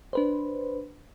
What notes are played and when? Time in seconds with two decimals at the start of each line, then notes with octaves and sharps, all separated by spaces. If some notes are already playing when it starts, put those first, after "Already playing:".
0.13 D4 B4 C5